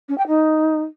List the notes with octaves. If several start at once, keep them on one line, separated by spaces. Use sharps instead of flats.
C#4
G5
D#4